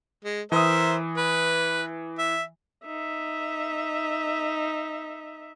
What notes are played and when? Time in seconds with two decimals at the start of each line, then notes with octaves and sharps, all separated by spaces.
0.25 G#3
0.52 E3 A#4 C5 E5 D#6
1.17 B4
2.18 E5
2.86 D#4 E5